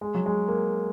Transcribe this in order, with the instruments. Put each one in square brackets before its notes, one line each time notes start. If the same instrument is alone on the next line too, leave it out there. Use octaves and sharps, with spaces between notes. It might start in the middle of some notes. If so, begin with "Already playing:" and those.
[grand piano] G#3
F#3
G#3
A#3